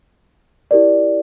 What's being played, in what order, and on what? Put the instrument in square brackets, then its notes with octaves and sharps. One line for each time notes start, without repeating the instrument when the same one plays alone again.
[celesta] E4 G4 A#4 D5